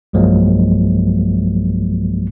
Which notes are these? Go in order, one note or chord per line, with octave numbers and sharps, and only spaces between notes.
B1 G2 F3 F#3 G#3 A#3